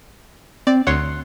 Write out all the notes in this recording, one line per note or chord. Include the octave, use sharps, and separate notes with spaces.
C4 D5
D2 C#5 F#5 C6